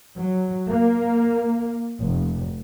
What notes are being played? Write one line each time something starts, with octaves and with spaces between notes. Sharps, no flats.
F#3
A#3
F1